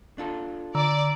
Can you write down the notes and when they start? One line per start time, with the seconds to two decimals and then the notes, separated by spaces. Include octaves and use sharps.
0.18 D4 F4 A4
0.75 D3 D5 A#5 E6